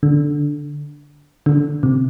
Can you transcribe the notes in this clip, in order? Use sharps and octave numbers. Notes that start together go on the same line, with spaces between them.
D3
D3
C3